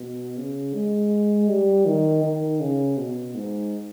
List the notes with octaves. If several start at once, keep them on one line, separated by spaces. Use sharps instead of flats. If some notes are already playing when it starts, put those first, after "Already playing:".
Already playing: B2
C#3
G#3
G3
D#3
D#3
C#3
B2
G#2